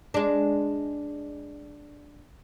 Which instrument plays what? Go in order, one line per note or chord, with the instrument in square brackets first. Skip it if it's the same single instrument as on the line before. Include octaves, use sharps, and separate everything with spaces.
[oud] G#3 D4